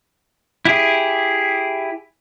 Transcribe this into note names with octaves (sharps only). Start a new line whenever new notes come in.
E4 G4 G#4